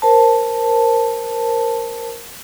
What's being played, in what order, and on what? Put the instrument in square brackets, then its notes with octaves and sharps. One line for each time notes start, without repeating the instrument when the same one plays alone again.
[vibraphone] A#4 C5 A5